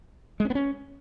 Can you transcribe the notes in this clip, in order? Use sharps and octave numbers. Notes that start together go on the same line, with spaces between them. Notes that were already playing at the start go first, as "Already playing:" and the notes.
G#3
C#4
B3
C#4